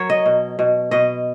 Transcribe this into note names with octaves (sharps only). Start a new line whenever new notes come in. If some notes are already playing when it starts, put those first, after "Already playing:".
Already playing: F#3 A#4 C#5
D#5
B2
B2
B2 D#5